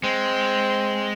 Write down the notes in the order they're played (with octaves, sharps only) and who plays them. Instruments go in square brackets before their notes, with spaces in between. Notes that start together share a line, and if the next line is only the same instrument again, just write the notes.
[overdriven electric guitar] G#3 [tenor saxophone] C4